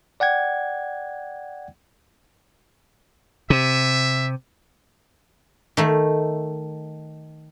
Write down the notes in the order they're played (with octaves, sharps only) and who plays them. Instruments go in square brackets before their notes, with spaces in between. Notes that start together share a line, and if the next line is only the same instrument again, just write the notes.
[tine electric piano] D5 F#5 G5 G#6
[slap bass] C3 [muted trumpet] E5
[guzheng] D#3 A3